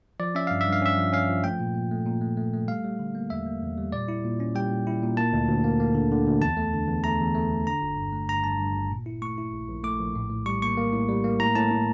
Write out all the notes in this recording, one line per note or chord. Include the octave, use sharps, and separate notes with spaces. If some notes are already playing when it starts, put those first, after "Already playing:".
F3 D5
C#4 E5
G2 F5
E5
G2
F5
C#4 E5
F3
C#4 F5
F3
A3 G5
A#2
A#2
A3
A#2
A3
A3
A3
G3 F5
G3
D3
A#3
E2 E5
A#3
E2
G3
A#2 D5
E4
A#2
C#4
G3 G5
A#2
E4
A#2
A#3 A5
D2
D2
A#3
A#3
D3
D3
D2
E2 A5
A3
D3
E2
A3 A#5
E2
A3
E2
D3 A#5
G1
G2
A3
G2 A#5
G2 A5
G2
G1
A#2
E4
A3 C#6
E4
A#1
A#1
A3 D6
A#1
A2
A2
G3 C#6
A#3 C#6
A#3
A2
G3
A#3
A2 A#5
A2 A5
A2